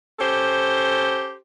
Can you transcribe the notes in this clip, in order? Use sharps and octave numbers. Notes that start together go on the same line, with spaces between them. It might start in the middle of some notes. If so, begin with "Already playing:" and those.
C#4 G4 A4 C5